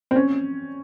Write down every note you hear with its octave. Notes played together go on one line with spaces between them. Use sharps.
C4
C#4